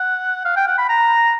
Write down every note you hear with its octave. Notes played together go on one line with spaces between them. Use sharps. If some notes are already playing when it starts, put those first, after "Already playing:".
Already playing: F#5
F5
G5
F#5
B5
A#5